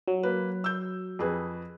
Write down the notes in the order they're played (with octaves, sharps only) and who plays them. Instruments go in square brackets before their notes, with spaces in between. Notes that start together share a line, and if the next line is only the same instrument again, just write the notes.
[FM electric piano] F#3
[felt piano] A#3 B4
E6 G6
F2 G#4 B4